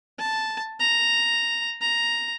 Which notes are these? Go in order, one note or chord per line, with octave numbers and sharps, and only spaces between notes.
A5
A#5
A#5